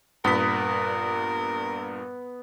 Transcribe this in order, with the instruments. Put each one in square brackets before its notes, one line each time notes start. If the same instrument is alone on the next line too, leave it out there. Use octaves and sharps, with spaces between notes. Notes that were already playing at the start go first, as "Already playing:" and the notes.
[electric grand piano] G2 A#2 B6 [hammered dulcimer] B3 [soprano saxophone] A#4